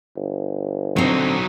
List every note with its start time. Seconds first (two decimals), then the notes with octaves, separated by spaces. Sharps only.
0.16 G1
0.96 D3 F#3 C4 D#4